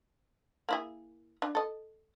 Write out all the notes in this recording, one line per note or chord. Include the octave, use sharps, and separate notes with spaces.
A#3 E4 G#4
D4
A4 D#5